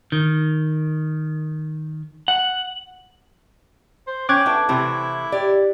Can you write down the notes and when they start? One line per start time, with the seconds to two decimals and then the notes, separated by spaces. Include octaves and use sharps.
0.12 D#3
2.28 F#5
4.07 C5
4.29 C#4 G5 D6 F#6 G#6
4.46 B3 D4 E4 A4
4.69 C3 E3 A3 C4 E4
5.32 G4 D5